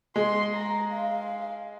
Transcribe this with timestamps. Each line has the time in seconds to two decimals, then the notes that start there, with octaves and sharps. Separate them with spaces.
0.16 G#3 C6
0.54 A#5
0.93 F5